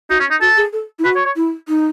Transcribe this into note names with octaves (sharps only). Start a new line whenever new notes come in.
D#4 F#4
C#4
D#4
F#4 A4
G#4
A4
E4
F#4 B4
C#5
C#5
E4
D#4